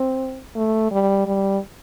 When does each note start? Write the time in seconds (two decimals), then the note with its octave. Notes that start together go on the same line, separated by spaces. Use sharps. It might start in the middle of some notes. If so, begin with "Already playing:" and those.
Already playing: C4
0.56 A3
0.91 G3
1.26 G3